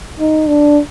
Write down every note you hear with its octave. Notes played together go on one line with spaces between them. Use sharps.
D#4
D4